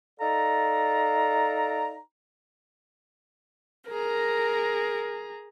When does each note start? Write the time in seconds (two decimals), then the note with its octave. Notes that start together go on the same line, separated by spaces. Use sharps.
0.20 D#4 A4 D5 F5 A#5
3.91 G#4 A#4 A#5